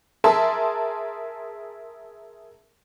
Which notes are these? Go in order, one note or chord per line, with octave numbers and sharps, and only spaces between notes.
G#4 A#4 E5 A5 C6